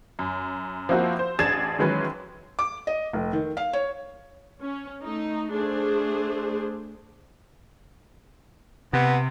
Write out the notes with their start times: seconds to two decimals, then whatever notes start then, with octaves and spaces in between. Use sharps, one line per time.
0.19 F#2
0.89 F3 A#3 C4 E4 F#4
1.19 C5
1.39 A1 D4 G#4 G#6 A6 E7
1.79 D#3 E3 F#3 G#3 C#4 B4
2.59 D6
2.87 D#5
3.13 F1
3.33 D#3
3.57 F5
3.73 C#5
4.61 C#4
5.02 A3 D#4
5.52 A3 D4 G#4 C5
8.93 C3 B3